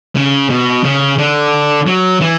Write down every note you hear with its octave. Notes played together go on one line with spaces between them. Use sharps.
C#3
B2
C#3
D3
F#3
E3